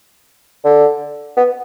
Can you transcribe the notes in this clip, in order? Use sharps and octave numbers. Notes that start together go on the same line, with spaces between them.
D3
B3